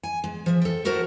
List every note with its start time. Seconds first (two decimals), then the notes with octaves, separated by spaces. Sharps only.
0.03 G#5
0.24 G#3
0.46 F3 E5
0.62 A4 G5
0.85 E4 F#4 A4 A#4 C5